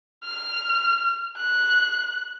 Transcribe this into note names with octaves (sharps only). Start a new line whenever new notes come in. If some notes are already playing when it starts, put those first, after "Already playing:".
F6
F#6